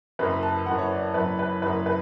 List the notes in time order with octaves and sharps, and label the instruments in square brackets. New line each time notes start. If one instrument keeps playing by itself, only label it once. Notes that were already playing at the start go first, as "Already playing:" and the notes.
[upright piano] F#1 F#2 E3 B4
A5
F#1 F#2 E3 F#5
C#5
D5
F#1 F#2 E3 B4
B4
F#1 F#2 E3 B4
B4